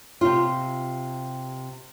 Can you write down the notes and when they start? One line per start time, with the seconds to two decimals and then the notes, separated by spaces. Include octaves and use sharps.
0.21 C3 F4